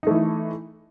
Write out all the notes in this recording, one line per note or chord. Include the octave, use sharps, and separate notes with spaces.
E3 A3 D#4 E4